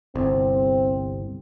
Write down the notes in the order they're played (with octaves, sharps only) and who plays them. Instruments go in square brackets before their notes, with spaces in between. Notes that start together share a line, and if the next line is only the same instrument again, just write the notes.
[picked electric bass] G1 C2 [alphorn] C4